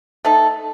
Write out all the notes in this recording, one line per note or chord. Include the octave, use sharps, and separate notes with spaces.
A3 D#4 A4